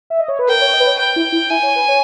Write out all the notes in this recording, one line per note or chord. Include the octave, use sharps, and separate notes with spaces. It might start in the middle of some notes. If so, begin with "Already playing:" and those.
E5
D#5
C#5
B4
A#4 G5
C#5
D#5
B4
C#5
B4 G5
E4
E4
E4 G#5
C#5
B4
C#5